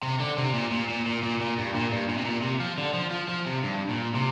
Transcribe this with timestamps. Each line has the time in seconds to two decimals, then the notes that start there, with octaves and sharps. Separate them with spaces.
0.03 C3
0.20 D3
0.38 C3
0.54 A#2
0.72 A#2
0.89 A#2
1.06 A#2
1.23 A#2
1.41 A#2
1.58 G2
1.75 A#2
1.92 G2
2.09 A#2
2.18 C3
2.25 A#2
2.42 C3
2.60 F3
2.78 D3
2.94 F3
3.11 F3
3.29 F3
3.46 C3
3.63 G2
3.89 A#2
4.15 C3